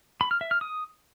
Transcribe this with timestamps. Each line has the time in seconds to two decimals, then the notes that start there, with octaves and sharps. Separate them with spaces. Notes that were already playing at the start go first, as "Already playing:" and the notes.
0.21 B5
0.31 F6
0.41 E5
0.51 F6
0.61 D#6